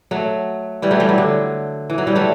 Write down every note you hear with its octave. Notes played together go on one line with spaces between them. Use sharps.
F#3 A3
E3 G3
F#3 A3
E3 G3
F#3
D3
E3
F#3
E3 G3
F#3 A3